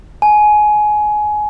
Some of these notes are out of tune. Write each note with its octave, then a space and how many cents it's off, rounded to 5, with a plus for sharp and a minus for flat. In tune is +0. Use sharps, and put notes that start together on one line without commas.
G#5 +20